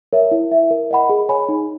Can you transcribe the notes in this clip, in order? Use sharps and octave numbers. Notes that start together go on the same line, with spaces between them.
A#4 C#5 E5
E4
A#4 E5
A#4
D#5 F#5 B5
G#4
C#5 G#5 B5
D#4